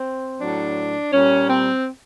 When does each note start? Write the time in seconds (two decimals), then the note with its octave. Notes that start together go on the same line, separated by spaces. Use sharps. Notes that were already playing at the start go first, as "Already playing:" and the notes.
Already playing: C4
0.39 A2 F#3 D4
1.11 A#2 G3 C#4
1.48 C4